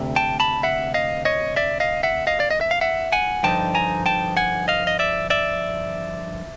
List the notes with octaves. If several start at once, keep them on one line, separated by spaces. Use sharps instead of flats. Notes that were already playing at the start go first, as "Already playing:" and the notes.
Already playing: D2 C3
G5 A5
A5 B5
E5 F#5
D#5 F5
C#5 D#5
D5 E5
D#5 F5
E5 F#5
D#5 F5
D5
D#5
E5
F5
E5 F#5
F#5 G#5
G2 D3 F3 D#4 G5 A5
G#5 A#5
G5 A5
F#5 G#5
D#5 F5
D#5
D5 E5
D5 E5